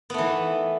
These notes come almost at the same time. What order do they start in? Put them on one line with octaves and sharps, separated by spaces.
B3 A3 E3